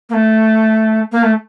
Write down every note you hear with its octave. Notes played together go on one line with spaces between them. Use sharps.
A#3
A3
A#3
A3